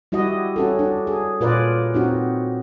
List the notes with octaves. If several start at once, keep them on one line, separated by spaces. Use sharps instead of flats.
G3 E4 F#4 D#5
C#4 F#4 A4
D4
G#4
A#2 F4 A#4 B4 C#5 D5
C4 D#4 F#4